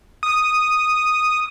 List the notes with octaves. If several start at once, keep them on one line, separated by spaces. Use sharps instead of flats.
D#6